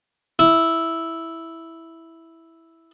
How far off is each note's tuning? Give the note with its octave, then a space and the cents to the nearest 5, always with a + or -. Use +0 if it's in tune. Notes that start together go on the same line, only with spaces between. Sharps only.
E4 -5